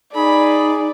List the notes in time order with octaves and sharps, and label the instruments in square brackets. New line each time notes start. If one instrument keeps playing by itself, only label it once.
[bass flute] D#4 [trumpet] G#4 [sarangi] D5 [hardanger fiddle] B5